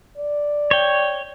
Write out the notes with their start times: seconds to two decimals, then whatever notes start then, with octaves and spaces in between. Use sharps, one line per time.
0.17 D5
0.71 C#5 G5